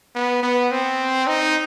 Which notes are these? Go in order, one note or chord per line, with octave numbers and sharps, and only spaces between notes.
B3
B3
C4
D#4